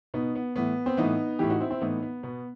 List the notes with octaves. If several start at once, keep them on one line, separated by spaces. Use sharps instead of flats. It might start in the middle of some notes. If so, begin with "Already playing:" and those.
B2 B3 D#4
B3
A2 E3 B3
C4
A2 E3 B3 D#4
A2 E3 E4 G4
D#4 F#4
C4 E4
C4 E4
A2 E3 B3 D#4
B3
B2 B3